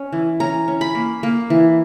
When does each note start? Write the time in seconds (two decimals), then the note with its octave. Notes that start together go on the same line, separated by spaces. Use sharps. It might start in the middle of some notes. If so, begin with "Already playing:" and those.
Already playing: C#4
0.13 E3
0.40 C#4 A#5
0.68 C#4
0.81 B5
0.95 A#3
1.23 A#3
1.50 E3